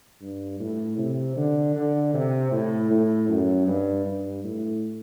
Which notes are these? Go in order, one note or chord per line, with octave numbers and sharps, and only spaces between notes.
G2
A2
C3
D3
D3
C3
A2
A2
F#2
G2
G2
A2